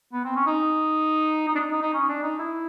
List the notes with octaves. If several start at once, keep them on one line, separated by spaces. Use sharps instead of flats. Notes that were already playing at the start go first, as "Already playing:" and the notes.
B3
C4
C#4
D#4
D#4
D4
D#4
D#4
D#4
C#4
D4
D#4
E4